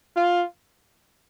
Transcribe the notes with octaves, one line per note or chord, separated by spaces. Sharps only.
F4